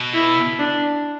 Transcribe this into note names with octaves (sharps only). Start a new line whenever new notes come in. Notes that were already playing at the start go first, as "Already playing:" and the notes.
Already playing: B2
E4
D4